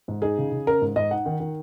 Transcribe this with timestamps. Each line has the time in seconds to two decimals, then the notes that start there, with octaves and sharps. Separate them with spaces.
0.08 G#2
0.22 D#4 G#4
0.38 C#3
0.52 C#3
0.67 C#4 A#4
0.82 G#2
0.96 G#2 D#5
1.11 D#4 F#5
1.26 D#3
1.40 D#3